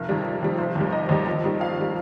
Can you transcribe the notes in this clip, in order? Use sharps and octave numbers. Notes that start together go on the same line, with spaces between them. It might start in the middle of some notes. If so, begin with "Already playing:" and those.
Already playing: F1 A#4
F2 D#3 G3
F1
F2 D#3 G3
F1 C5
D#2 D#3 G3
F1 D#5
D#2 D#3 G3
F2
D#3 G3
F2 F5
D#3 G3